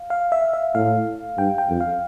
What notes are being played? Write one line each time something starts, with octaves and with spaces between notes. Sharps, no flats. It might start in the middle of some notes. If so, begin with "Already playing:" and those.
Already playing: F5
F5
E5
E5
A2 F5
G2 G5
G5
F2
F5